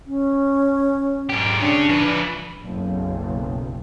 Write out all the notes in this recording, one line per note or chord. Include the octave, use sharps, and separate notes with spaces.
C#4
G#2 G4
C#4 D4 G#4
F3 B4
F#1 B1